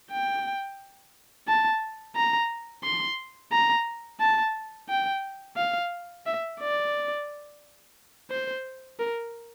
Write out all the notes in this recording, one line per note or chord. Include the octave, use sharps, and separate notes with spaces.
G5
A5
A#5
C6
A#5
A5
G5
F5
E5
D5
C5
A#4